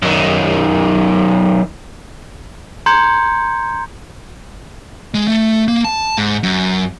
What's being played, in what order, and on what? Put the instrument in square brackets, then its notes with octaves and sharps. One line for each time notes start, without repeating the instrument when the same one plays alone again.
[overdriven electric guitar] F#2 D#3
[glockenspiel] A#5 C6 G6 G#6 C#7
[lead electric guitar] G#3
A3
A#3
A5
G#2
F#2